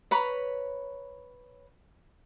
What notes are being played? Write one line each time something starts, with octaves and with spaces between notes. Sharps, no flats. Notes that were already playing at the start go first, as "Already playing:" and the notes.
B4 C#5 A#5 B5